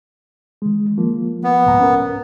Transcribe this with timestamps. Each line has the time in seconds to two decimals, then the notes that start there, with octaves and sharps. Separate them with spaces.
0.62 D#3 G#3
0.98 F3 A#3
1.44 B3
1.66 C2 G#2 A#5
1.80 C#4 A#4